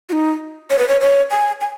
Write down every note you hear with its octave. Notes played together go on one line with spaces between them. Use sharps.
F#4
D#4
C#5
B4
C#5
C#5
G#5
G#5